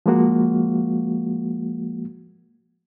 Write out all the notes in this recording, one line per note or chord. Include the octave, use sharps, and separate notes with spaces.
F3 G#3 A#3 F#4